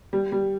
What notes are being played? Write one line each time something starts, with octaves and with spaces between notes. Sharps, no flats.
G3
G3